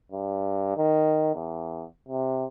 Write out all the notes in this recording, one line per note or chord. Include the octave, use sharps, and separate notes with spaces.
G2
D#3
E2
C3